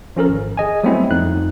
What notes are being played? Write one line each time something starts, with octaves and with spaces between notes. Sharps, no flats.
F3 C#4 A4 A#4
G#1
G#4 D#5 G#5
F#3 G3 A3 B3 C4 E4
F2 D#4 F#6